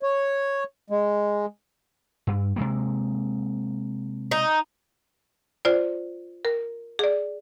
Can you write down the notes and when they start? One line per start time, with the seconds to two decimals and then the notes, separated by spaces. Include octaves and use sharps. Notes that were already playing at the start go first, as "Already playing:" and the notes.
0.02 C#5
0.90 G#3
2.27 G2
2.56 C3 G#3 A#3
4.31 D#4
5.65 F4 C5 D5
6.45 A#4
6.99 G#4 D5